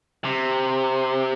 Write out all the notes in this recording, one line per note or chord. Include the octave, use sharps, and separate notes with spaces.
C3